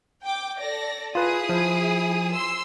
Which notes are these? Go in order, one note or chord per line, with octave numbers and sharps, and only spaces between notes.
G5 D6
A4 D5 A#6
E4 F4 G#4 B4 D#6
F3
C6 E6